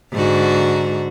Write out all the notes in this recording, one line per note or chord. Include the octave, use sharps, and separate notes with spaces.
G#2 D3 F#4